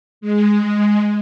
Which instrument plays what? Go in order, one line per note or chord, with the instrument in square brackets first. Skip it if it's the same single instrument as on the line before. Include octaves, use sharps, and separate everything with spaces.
[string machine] G#3